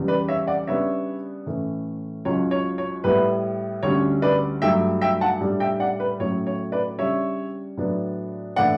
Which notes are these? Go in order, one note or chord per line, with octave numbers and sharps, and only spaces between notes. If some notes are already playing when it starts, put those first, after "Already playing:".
Already playing: E2 C#3 G3
B4 D5
C#5 E5
D5 F#5
C#3 G3 B3 D4 C#5 E5
A2 E3 A3 C#4
C#2 C#3 F#3 C#5
C#5
C#5
A2 G3 B3 E4 B4
D2 D3 G3 C#4 C#5
B4 D5
G2 F#3 A3 E5 G5
E5 G5
F#5 A5
A2 G3 D4
E5 G5
D5 F#5
B4
A2 F#3 A3 C#4 E4 C#5
C#5
B4 D5
C#3 G3 D4 C#5 E5
A2 F#3 B3 D4
A2 E3 A3 D4 D5 F#5